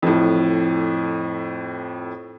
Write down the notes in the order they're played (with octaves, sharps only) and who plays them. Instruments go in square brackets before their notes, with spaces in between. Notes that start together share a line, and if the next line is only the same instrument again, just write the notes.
[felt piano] F2 A2